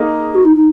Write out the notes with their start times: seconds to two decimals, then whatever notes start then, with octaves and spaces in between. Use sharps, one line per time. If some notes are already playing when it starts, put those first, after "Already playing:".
Already playing: A#3 D#4 G#4
0.34 F#4
0.44 D#4
0.55 D#4